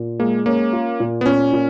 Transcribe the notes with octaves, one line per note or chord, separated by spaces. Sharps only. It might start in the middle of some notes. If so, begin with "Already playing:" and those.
Already playing: A#2
G#3 A#3
A#3 C#4
F4
A#2
B3
A#2 C#4
A#2